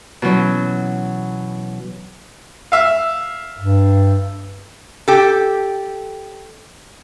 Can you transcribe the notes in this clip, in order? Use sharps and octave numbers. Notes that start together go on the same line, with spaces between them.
B2 E3 F#3 C#4
E5 F5
G2
G4 A4